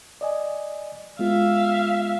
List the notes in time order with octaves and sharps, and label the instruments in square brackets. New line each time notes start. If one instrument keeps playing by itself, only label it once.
[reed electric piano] D5 D#5 G#5
[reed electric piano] G#3 B3 F4 [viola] E5 F5